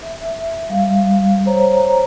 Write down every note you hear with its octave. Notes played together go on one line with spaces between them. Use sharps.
E5
G3 F5
C5 C#5 A#5